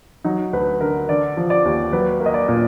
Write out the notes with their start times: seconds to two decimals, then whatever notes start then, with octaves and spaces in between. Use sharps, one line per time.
0.24 F#3 D#4
0.53 D2 B4
0.81 D3 A#4
1.09 D3 D5
1.37 F3
1.50 D5
1.65 D#2
1.93 F#3 B4
2.20 A#3
2.26 D#5
2.34 D5
2.48 A#2